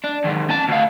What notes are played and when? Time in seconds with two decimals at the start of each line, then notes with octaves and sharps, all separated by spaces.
0.04 D4
0.25 D#2 G#2
0.50 C#4 A5
0.69 D2 F5